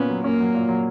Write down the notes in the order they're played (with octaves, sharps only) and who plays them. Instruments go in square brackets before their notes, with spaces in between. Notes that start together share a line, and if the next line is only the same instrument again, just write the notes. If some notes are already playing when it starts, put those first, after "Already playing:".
Already playing: [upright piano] A#2 C#4 [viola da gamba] B3
[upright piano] F#3
[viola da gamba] A#3 [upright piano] C#4
[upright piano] F#3
A#2
F#3